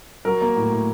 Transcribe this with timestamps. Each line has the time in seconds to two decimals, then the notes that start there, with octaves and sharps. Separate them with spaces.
0.25 F#3 A#4
0.42 A#3
0.56 A2
0.71 A2